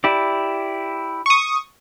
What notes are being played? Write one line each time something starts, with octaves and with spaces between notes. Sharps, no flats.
E4 G4 D5
C#6 D#6